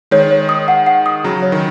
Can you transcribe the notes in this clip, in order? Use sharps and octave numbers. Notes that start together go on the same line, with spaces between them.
D#3 G#3 C#5
C#5
D#6
F#5
F#5
D#6
C#3 F#3 A#5
C#5
D#3